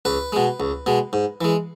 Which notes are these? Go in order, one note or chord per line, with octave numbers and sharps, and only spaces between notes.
C#2 B4
B2 G#3
C#2
B2 G#3
G#2
E3 G#3